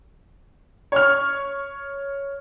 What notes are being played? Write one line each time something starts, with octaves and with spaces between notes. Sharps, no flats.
C#5 C#6 F6